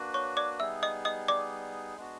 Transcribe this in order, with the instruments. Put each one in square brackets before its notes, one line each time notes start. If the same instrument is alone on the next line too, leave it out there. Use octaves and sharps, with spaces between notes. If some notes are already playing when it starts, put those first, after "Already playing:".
Already playing: [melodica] A#3 D4 F#4 B4
[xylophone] C#5 C#6
D5 D6
[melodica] G3 B3 D#4 G#4 [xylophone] E5 E6
[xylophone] D#5 D#6
D#5 D#6
D5 D6
[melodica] G#3 B3 D4 F#4